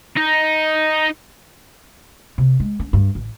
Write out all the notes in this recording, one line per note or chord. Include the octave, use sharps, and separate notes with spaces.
D#4
C3
G#3
C#4
G2
A1